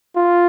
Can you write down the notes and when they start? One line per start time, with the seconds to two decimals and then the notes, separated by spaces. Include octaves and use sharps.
0.16 F4